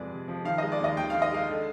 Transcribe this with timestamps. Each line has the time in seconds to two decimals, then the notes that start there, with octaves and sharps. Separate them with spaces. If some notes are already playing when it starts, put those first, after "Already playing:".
Already playing: F2 C3 F3 G#3 G#4 B4 D5
0.11 C3
0.28 F3
0.45 D#3 F5
0.58 D#5
0.62 G#3
0.72 D5
0.81 D#2 D#5
0.97 D#2 G5
1.10 D#3 F5
1.22 D#5
1.32 G#3 F5
1.49 D3